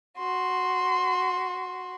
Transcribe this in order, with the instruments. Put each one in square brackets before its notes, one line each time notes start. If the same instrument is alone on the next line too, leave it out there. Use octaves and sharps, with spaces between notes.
[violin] F#4 C6